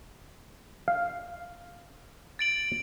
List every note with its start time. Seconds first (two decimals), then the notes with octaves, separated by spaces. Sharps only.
0.88 F5
2.39 A6 D7 F#7